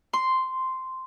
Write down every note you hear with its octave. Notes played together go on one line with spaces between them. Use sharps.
C6